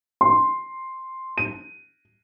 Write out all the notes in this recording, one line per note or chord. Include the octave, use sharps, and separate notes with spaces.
C6
D#7